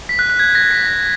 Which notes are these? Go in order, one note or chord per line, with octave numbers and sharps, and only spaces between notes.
B6
F#6
F#6
G#6
A#6
B6
A#6